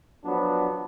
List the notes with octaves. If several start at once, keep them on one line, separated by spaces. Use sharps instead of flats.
F3 F#3 B3 D4